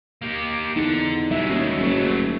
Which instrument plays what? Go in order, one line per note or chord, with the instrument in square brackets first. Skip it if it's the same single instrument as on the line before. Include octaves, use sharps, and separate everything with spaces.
[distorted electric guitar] A#3 G4
[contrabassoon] E2 [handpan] D#4 [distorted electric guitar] A4 F#5
[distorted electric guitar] B2 G#3 [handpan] G3 E5
[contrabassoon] D#2 [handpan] C#4
[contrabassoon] F#1 [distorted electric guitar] F#3 A3